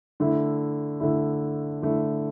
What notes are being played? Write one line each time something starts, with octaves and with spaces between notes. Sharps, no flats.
D3 A3 E4
D3 A3 E4
D3 A3 E4